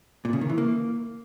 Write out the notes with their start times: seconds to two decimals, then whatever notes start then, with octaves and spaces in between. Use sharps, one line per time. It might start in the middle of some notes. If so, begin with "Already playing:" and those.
0.25 A#2
0.33 C#3
0.41 D#3
0.49 E3
0.58 A#3